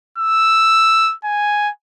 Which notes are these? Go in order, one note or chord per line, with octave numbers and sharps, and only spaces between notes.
E6
G#5